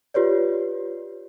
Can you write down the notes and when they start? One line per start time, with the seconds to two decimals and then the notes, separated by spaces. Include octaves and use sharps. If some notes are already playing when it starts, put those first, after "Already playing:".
0.14 F4 G4 B4 C#5 D5